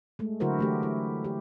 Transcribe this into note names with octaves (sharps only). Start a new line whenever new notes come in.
G#3 A3
D3 F#3 E4 F#4 A#4 C5
E3 A3 G4
E4
G4